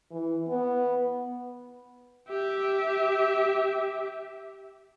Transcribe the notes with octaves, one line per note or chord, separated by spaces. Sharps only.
E3
B3
G4 E5